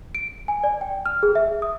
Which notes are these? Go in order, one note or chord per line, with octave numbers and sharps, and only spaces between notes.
D7
G#5
D5
G5
F6
G#4
E5
D#6